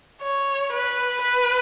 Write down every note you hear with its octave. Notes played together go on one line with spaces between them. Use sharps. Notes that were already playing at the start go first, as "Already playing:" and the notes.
C#5
B4
B4